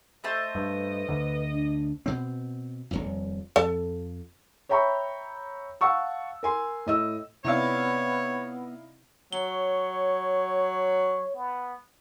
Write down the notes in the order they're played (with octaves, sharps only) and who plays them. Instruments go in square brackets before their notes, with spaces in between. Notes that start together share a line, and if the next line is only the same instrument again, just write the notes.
[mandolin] A3 C5 A5 [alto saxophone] D#5
[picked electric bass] G2 [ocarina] B4
[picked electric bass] D2 D3
[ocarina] D4
[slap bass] B2 C4
D#1 G#1 F2
[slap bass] F2 [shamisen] A4 A5
[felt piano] C#5 E5 G5 A#5 B5 C#6
F5 F#5 A5 C#6 E6
A#4 G#5 C6
A2 D#5 E6
[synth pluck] C3 C4 D5 [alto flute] B3 [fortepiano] D#4 E4 F5 [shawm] C#5
[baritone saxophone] F#3 [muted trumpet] C#5 [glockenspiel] G7
[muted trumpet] B3